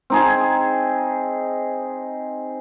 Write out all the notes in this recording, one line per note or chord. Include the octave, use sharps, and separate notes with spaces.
C4 D#4 G#4